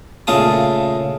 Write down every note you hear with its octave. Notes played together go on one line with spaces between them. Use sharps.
A#2 C#3 A3 F5 A5 D#6